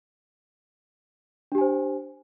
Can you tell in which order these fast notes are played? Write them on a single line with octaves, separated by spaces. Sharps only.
D4 G4 G#5 C5